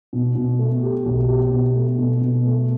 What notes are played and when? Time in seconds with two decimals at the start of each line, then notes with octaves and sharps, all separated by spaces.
0.13 B2
0.35 B2
0.59 A3
0.83 G4
1.05 B1
1.29 G4
1.52 B2
1.75 A3
1.98 B2
2.21 B2
2.45 A3